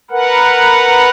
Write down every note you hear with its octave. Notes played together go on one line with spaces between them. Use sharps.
A#4 B4 F#5